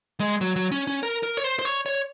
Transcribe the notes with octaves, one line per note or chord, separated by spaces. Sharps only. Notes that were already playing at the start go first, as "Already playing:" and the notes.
G#3
F#3
F#3
C#4
C#4
A#4
A#4
C#5
C5
C5
C#5
C#5